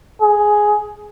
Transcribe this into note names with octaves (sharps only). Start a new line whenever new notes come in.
G#4